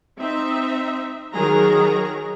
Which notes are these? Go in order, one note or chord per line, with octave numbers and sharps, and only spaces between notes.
C4 D#4 E5
D#3 F#3 G#4 A#4 A#5